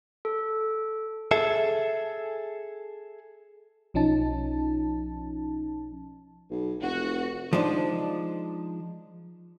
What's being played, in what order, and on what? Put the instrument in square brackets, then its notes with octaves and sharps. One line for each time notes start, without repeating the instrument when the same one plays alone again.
[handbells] A4
[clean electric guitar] G#4 A4 E5
[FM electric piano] B1 F3 C#4 D#4 A5
[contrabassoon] B1
[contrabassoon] F1 [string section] F#4
[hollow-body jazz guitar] F3 G#3 D4 D#4